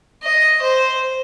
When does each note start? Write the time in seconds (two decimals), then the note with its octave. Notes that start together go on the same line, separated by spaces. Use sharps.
0.23 D#5
0.62 C5